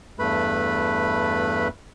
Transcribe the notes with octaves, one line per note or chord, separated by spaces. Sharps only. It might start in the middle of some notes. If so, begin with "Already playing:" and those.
E2 G2 A3 B4 B5